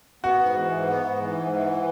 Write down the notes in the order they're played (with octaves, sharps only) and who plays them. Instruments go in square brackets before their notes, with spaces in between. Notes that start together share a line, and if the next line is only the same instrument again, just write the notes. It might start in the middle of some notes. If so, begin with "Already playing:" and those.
[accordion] B3 [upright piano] F#4
[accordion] G#2
E3
G#2
B3
G#2
E3
G#2
E3